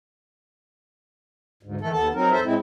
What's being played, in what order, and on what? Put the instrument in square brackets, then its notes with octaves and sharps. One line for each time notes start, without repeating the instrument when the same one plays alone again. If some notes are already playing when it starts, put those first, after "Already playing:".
[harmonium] D2 G#2
D#3 E3 A3 A4
D#2 B3 A4 A5
F#3 C4 D#4 A#4
F2 A4 C5 E5
A2 G#3 C4 E4